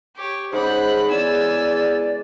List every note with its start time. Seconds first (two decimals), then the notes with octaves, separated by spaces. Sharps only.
0.16 G4 C#5
0.52 G#2 C#3 G#3 C5 F#5 B5
1.10 E2 D5 G#5 E6